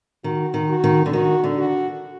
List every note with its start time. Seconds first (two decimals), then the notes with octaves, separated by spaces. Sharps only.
0.24 D#3 F#4
0.54 D#3
0.69 F#4
0.84 D#3
1.06 D3
1.13 D#3 F#4
1.44 D3
1.58 F#4